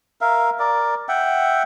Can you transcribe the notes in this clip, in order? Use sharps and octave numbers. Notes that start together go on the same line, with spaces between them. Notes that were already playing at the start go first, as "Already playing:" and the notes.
A#4 E5 F5
A#4 D5
E5 F#5 G5